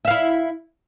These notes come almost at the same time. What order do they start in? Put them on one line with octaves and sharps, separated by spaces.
E5 F5 E4